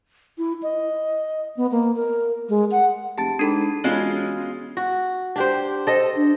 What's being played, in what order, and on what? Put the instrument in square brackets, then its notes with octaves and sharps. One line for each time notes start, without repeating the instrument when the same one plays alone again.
[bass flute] E4
D#5
B3
A#3
A#4
G#3
F#5
[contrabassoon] F1 [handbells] G4 A5 A6
[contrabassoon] G#2 [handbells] D4 A4 B5
[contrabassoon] E1 [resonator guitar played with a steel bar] G#3 C#4 F4 [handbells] F#4 C#5
[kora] F#4
D4 G4 C5
[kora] A4 D#5 [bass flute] C5
[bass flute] D4